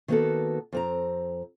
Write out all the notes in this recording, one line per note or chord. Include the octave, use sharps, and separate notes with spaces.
D#3 A#3 B3 F#4 A4
F2 C4 A#5